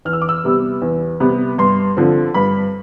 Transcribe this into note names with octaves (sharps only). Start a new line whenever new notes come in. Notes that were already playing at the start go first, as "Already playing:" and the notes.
E2 F6
E6
D6
E6
C3 G3 B3
E2
C3 G3 B3
G2 C6
D3 F3 C4
G2 B5